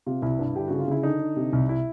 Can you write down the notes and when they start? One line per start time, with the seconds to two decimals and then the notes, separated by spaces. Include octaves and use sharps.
0.06 C3 F4
0.22 C2 E4
0.39 G2
0.55 D3 G4
0.68 C#3 F#4
0.80 F4
0.88 C#3 E4
1.03 D3 D#4
1.20 D3
1.36 C3
1.53 C2
1.69 E4